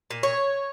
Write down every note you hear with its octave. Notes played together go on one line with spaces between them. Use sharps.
A#2
C#5